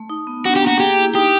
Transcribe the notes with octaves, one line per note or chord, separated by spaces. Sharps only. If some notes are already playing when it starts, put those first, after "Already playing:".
Already playing: A3
D#4
B3
D4 F#4
G4
A#3 F#4
G4 G#4
E4
D#4 G4